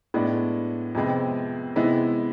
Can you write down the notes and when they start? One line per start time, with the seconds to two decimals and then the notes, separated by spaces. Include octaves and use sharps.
0.14 A2 G#3 B3 D4
0.95 F2 C3 G#3 B3
1.76 C3 E3 G#3 B3 E4